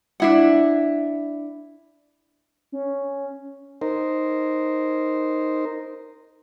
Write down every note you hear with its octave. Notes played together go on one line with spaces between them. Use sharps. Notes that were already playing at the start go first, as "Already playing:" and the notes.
D4 E4 F#5
C#4
D#4 A#4 C5